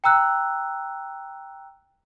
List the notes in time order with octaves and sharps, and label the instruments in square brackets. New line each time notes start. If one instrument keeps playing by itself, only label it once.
[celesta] G5 A#5 E6 F#6